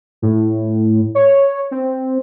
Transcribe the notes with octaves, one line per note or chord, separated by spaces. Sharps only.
A2
C#5
C4